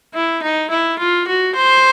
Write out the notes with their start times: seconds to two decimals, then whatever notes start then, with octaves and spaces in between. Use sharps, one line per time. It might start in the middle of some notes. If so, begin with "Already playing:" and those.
0.14 E4
0.42 D#4
0.70 E4
0.99 F4
1.28 F#4
1.55 C5